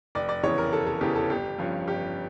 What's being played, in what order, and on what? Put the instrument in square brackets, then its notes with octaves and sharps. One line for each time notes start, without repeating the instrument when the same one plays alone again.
[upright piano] F1 D5
D5
E2 C#3 E3 C#5
A#4
F1 A4
A4
E2 C#3 E3 G4
A4
G1 G4
G2 F3 C#4
G1 G4